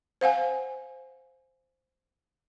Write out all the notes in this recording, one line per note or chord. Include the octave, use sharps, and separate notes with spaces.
C5 F5 F#5 G#5